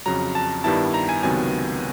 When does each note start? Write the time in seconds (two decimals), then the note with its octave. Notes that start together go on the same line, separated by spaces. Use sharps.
0.06 F2 C#3 F#3 A#5
0.35 A5
0.64 G2 D#3 G3 B3 E4 A5
0.94 A#5
1.09 G#5
1.23 C#2 C3 D#3 F#3 B3 G#5